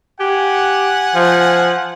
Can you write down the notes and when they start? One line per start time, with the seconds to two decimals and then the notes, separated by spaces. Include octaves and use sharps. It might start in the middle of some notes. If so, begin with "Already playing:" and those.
0.20 G4 F#5 G#5
1.15 F3